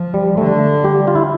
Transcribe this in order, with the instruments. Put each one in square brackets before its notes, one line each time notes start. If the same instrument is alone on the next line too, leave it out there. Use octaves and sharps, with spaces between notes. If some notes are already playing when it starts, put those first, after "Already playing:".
Already playing: [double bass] F3
[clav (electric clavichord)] G3
[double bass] D3 [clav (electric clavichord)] A3
[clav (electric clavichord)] G3 G4
F4
E4